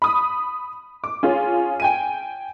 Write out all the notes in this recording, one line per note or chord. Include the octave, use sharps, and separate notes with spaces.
B5 D#6
D6
C#4 F4 G#4
G5 G#5 D#7